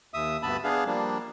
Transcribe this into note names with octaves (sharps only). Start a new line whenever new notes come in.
D#2 E5 D#6
D2 G2 B3 E5 A5 B5
B3 D4 G#4 F5
F3 G3 A#3 D4